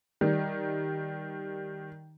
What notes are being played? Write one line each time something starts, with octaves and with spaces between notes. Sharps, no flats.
D#3 G3